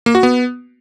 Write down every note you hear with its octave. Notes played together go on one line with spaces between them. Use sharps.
A#3
F#4
B3